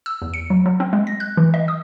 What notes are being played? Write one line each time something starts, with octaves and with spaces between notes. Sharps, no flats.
E6
E2
C#7
F#3
F#3
C4
G#3
A#6
F#6
E3
D#5
D#6